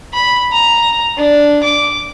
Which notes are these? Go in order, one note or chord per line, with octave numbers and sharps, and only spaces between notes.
B5
A#5
D4
D6